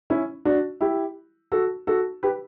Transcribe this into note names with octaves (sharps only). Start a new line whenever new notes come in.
C#4 E4
D4 F#4
E4 G4
F#4 A4
F#4 A4
G4 B4